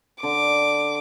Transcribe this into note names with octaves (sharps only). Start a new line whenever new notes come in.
D3 D6